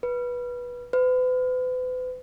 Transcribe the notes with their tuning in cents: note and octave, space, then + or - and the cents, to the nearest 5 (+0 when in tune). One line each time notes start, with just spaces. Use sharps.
B4 -15
B4 +40